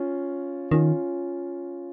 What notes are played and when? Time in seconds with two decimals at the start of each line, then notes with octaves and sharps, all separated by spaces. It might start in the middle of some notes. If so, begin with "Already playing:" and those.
Already playing: C#4 F4
0.71 D#3 C#4 F4